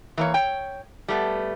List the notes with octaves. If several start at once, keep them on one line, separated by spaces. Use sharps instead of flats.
E3 A#3 C#5
C#5 G5
G3 A3 B3